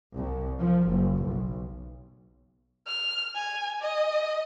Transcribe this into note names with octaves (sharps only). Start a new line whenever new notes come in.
C2
F3
F#1
B1
F6
G#5
D#5